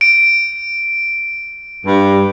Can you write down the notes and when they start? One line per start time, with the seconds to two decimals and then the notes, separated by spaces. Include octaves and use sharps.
0.01 D7
1.86 G2